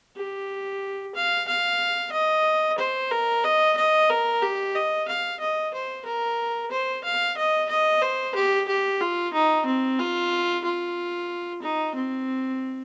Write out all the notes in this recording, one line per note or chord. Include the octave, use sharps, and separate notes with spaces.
G4
F5
F5
D#5
C5
A#4
D#5
D#5
A#4
G4
D#5
F5
D#5
C5
A#4
C5
F5
D#5
D#5
C5
G4
G4
F4
D#4
C4
F4
F4
D#4
C4